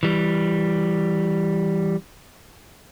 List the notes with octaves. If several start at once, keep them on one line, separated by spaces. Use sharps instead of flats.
E3 G3